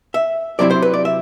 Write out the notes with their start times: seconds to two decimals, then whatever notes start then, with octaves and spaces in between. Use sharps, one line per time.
0.14 E5
0.59 C3 F#3 C4 E4 D5
0.70 C5
0.82 B4
0.94 D5
1.05 E5